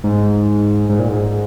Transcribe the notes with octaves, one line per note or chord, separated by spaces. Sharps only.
G#2
G#2
A#2
G#2